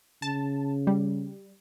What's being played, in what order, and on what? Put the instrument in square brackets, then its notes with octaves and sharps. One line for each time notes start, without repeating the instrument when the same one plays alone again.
[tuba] C#3 [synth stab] A5
[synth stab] G3